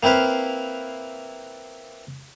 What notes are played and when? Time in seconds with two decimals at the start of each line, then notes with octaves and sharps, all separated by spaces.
0.03 A#3 C4 E4 B4 F5